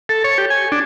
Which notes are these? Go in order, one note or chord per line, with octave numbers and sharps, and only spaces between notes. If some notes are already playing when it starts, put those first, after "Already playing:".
A4
C#5
G4
G#5
D4